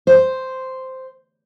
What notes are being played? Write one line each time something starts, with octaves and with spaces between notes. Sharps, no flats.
C5